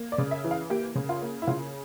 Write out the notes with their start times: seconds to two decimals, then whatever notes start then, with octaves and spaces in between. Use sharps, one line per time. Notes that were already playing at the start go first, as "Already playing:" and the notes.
Already playing: A#3
0.12 D5
0.18 C#3
0.31 E5
0.44 E3
0.51 F5
0.70 A#3 G4
0.95 C#3
1.09 F4
1.22 A#3
1.42 E4
1.47 C#3 F4